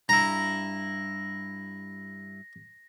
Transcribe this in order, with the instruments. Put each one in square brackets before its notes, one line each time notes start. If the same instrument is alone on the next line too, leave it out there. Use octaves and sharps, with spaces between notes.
[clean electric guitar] G2 E4 [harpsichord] A#5 [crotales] A#6